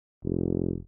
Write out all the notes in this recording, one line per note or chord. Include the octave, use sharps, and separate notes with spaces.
F1